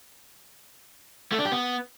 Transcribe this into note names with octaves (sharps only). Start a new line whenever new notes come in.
A3
D4
G4
B3